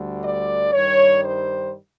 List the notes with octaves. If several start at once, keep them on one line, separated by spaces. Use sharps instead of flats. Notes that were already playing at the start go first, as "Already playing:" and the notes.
Already playing: D2 D3 G3
D5
G2 D#3 G3 C#5
C5